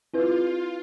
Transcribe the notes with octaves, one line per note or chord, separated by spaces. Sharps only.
C4 E4 F4 B4